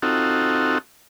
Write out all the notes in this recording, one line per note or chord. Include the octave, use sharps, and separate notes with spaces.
C4 D#4 F4 F#4 A4